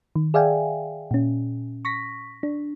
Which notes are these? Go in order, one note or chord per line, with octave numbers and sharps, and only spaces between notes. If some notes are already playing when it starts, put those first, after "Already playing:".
D#3
G#4 D5 E5 F5 G5 G#5
A#2 C#4
C#6 A#6 B6
D4